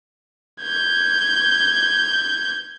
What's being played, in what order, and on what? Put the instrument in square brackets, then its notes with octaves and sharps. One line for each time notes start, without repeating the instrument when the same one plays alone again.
[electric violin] G6 G#6